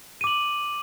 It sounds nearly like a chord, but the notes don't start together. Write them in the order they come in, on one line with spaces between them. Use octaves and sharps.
D#7 D6 F#7